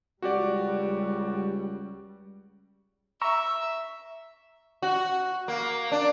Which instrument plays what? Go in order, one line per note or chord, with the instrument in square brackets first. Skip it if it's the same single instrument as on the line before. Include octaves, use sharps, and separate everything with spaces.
[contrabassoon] C#2 [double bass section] G3 [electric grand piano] F#4 G4 D5
[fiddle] E5 [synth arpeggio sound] A#5 C#6 E6
[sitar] F#4
A#3
D4